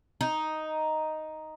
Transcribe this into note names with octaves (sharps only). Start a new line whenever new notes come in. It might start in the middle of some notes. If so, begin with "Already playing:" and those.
D#4